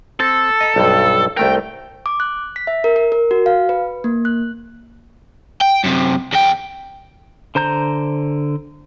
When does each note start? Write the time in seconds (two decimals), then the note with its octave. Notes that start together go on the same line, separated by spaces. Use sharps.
0.20 C4 A4
0.61 D#5 A#5
0.76 B1 G2
1.37 C2 A3 A#4 G5
2.06 D6
2.20 F#6
2.56 B6
2.67 E5
2.84 A#4
2.96 A#4
3.12 A#4
3.31 F#4
3.46 F5
3.69 B4
4.04 A#3
4.25 F#6
5.61 G5
5.84 F#2 C3
6.32 E2 G5
7.55 D3 C5 A#5 G6